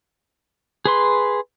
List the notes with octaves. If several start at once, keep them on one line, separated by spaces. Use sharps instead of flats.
G#4 B4 C6